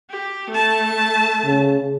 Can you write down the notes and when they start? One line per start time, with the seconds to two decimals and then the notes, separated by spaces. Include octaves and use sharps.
0.10 G4
0.50 A3 A5
1.45 C#3